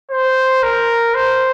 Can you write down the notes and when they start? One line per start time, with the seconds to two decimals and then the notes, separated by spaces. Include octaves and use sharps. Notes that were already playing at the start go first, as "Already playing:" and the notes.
0.11 C5
0.63 A#4
1.14 C5